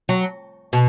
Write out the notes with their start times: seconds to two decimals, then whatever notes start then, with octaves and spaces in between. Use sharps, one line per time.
0.09 F#3
0.73 B2